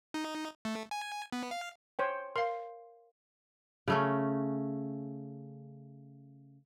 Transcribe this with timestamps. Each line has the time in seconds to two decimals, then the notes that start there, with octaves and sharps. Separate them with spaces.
0.14 D#4
0.65 A3
0.91 G#5
1.32 B3
1.51 F5
1.99 C5 C#5 G5
2.36 A#4 F5 C6
3.88 C#3 A3 C#4